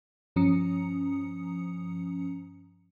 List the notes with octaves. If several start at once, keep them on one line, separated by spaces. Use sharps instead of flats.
G2 F3 C#4 A#5 D#6 C#7